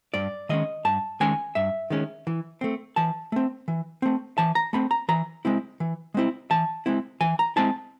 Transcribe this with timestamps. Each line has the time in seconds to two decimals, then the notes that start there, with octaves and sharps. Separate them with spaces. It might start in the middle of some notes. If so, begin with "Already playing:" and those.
0.14 G2 D5
0.49 D#3 G#3 C#4 D#5
0.85 G2 A5
1.20 D#3 G#3 C#4 G#5
1.55 G2 E5
1.90 D#3 G#3 C#4
2.27 E3
2.61 A3 C4
2.96 E3 A5
3.32 A3 C4
3.68 E3
4.02 A3 C4
4.38 E3 A5
4.55 A#5
4.73 A3 C4 B5
4.91 A#5
5.08 E3 A#5
5.45 G#3 C4 E4
5.80 E3
6.14 G#3 C4 E4
6.51 E3 A5
6.86 G#3 C4 E4
7.21 E3 G#5
7.39 A#5
7.56 G#3 C4 E4 A5